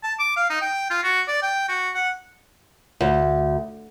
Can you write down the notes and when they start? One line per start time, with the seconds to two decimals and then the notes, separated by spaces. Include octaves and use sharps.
0.03 A5
0.19 D6
0.37 F5
0.50 D#4
0.61 G5
0.90 F4
1.03 F#4
1.28 D5
1.42 G5
1.69 F#4
1.95 F#5
3.01 D2